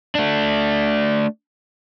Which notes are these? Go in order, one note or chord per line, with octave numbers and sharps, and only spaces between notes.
A3 D4